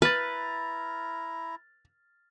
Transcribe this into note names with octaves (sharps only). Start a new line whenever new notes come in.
E4 B4 A#5 F6 A6